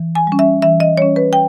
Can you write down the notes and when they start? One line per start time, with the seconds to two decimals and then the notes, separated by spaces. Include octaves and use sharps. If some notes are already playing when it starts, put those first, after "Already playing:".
Already playing: E3
0.15 G#5
0.27 G3 C#4
0.39 E5
0.62 E3 E5
0.80 D#5
0.97 G3 C#4 C#5
1.16 B4
1.33 G5